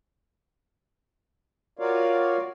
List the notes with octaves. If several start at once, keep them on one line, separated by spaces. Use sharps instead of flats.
F4 F#4 A#4 C#5 D5 F5